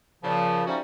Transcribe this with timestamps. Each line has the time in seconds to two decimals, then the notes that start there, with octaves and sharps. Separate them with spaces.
0.23 A#2 C#3 F3
0.67 F3 G3 A3 C#4 D#4 F#4